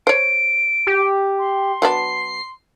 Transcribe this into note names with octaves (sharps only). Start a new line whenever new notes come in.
C5 C#5 D7
G4
C6
F#3 B3 D4 C7